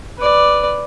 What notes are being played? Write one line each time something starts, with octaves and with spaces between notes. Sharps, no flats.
B4 D5